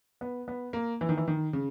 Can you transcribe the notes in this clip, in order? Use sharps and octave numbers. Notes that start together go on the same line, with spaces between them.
B3
B3
A#3
E3
D#3
E3
D#3
C#3